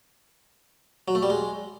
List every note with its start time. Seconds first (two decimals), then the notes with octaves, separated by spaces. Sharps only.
1.08 F#3
1.15 A3
1.23 G3
1.30 G#3